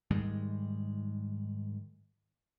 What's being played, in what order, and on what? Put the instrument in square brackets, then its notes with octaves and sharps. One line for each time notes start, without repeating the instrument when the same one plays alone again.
[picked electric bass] G#2 D#3 G3 G#3